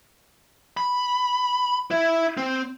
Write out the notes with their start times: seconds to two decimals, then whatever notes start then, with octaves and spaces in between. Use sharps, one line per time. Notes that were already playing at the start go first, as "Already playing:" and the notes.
0.77 B5
1.91 E4
2.37 C4